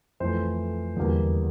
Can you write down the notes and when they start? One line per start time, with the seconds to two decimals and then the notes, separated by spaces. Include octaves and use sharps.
0.20 F2 E3 A3 C5
0.96 E2 D3 G3 A#3